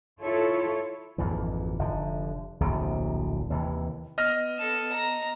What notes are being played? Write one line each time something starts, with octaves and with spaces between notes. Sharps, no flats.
E4 F4 A4 C#5
G#1 F2 A#2 E3
F1 D3
D1 A#1 C3
D#2 C3 E3
B3 D#5 F6 A#6
A4 E7
A#5